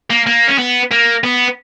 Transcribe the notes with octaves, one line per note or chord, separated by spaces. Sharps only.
A#3
A#3
C#4
B3
A#3
B3